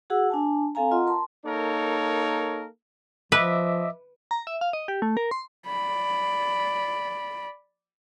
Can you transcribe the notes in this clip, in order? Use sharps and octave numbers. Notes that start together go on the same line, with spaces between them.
F#4 G#4 F#5 E6
D4 G#5 A5
C4 A4 F5 G#5 A#5
F4 D#5 F#5 A#5 C6
A#4 A5 C6
A#3 D#4 A4 A#4 C#5
F3 B4 D#5 E5 D6
A#5
E5
F5
D#5
G4
A3
A#4
C6
D5 B5